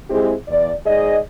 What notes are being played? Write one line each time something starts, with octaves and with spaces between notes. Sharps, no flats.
G#3 C4 E4 G4 G#4
E2 D5
G#2 G#4 D5 D#5